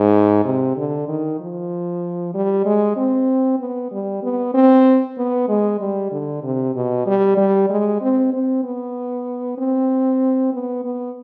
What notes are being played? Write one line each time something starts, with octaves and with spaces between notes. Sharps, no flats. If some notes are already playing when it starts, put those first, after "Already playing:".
Already playing: G#2
C3
D3
D#3
F3
G3
G#3
C4
B3
G3
B3
C4
B3
G#3
G3
D3
C3
B2
G3
G3
G#3
C4
C4
B3
C4
B3
B3